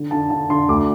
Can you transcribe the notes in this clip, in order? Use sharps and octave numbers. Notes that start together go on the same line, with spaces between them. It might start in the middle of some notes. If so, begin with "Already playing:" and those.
Already playing: D3
D3 A5
D3 A5
D3 C6
D2 D6